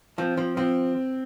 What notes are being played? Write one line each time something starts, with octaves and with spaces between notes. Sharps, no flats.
F3 C4
F3
F3 C4